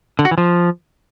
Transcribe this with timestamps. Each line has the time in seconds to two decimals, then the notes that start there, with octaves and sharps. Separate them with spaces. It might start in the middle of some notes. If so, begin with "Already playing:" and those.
0.19 D3
0.25 F#4
0.31 E3
0.38 F3